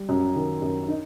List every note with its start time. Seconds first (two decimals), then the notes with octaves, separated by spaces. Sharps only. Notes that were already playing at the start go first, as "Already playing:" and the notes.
Already playing: G3
0.09 F#2
0.36 D#3
0.62 F#2
0.88 D#4